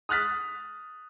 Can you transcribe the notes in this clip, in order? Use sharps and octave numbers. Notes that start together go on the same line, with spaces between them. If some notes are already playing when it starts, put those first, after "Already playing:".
D#6 F6 F#6 A6 B6